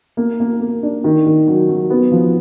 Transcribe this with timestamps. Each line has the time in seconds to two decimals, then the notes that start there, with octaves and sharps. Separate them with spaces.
0.17 A#3
0.40 A#3
0.61 A#3
0.83 D4
1.04 D#3
1.26 D#3
1.48 F#3
1.69 F#3
1.90 B3
2.11 F3